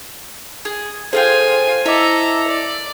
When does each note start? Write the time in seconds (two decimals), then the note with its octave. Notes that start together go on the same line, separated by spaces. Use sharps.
0.65 G#4
1.13 F4 G#4 A4 C5 F5 G5 G#5
1.86 E4 A4 D#5 E5 A#5 D6
2.48 D5